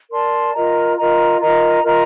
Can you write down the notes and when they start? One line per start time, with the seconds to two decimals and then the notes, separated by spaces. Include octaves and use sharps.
0.11 A#4 D5 A5 C6
0.54 F4 A#4 D#5 A#5
0.97 F4 A#4 D#5 A#5
1.40 F4 A#4 D#5 A#5
1.83 F4 A#4 D#5 A#5